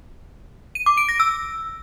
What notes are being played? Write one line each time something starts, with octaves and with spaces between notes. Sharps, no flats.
D#7
D6
D7
A#6
E6